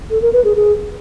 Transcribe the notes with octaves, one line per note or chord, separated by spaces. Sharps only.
A4
A#4
B4
G#4
G#4